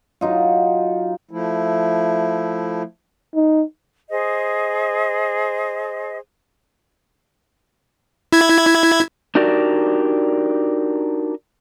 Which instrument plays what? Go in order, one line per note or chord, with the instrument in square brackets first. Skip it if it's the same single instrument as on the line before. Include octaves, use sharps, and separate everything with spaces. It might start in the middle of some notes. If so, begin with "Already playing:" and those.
[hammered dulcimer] F#3 D#4 F4
[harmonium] F3 A3 E4
[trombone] D#4
[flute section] G#4 C5 D#5
[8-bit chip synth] E4 G#6
[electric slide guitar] D4 D#4 F#4 G4 A#4 D5